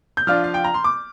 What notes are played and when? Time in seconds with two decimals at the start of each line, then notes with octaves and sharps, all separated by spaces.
0.17 G6
0.27 F3 D4 F4 F6
0.44 F5
0.54 G5
0.64 A#5
0.74 C6
0.84 D6